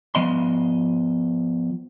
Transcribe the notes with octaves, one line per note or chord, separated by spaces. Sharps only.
F3 B3 D#5 C6